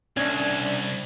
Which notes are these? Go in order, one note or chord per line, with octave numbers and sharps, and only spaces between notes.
C2 C#4 D4 G#6